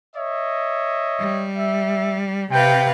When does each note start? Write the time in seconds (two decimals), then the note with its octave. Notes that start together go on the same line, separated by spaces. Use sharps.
0.15 C#5 D#5 E5
1.18 G3
1.56 E5
2.52 C3 B4 F5 G5